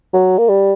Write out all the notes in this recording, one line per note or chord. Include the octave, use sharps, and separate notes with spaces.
F#3
A#3
G3